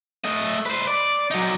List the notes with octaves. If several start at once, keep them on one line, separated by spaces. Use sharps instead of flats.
A3 D#5
B4 C5
D5
F#3 D#4